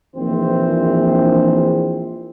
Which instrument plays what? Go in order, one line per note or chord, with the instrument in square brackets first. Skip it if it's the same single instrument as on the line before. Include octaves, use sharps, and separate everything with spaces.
[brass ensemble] A#1 E3 [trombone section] D#3 C4 C5